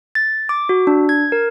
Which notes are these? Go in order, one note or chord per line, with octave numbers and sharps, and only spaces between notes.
A6
D6
F#4
D4
G#6
A#4